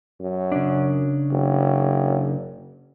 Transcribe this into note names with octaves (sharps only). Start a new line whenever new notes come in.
F#2
C#3 D4
F#1